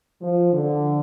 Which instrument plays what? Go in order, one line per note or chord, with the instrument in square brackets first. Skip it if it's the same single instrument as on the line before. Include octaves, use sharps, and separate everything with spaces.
[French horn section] F3
D3